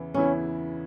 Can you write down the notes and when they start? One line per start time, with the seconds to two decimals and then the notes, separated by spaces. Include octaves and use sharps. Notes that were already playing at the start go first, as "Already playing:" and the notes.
Already playing: E2 C#3 E3 B3 E4
0.14 E2 C#3 E3 B3 C#4 E4